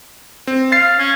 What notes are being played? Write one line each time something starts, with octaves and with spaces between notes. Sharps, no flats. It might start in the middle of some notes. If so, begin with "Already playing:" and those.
C4
F5 A6 C7
C#4